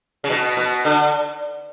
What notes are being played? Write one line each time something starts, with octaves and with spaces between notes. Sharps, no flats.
C#3
B2
B2
D3